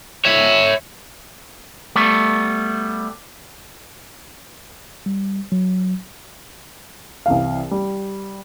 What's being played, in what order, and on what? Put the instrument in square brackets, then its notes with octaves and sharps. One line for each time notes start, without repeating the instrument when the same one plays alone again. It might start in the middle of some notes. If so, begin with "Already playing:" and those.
[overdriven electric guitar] C#5 E5
[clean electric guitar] G3 A3 B3
[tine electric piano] G3
F#3
[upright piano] C2 E3 F5
G3